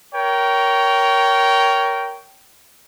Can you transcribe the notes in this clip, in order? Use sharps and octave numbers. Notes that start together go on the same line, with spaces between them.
A#4 C#5 G5